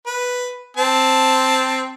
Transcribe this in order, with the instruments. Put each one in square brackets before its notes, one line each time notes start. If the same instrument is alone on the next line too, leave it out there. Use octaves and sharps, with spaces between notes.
[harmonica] B4
C4 A5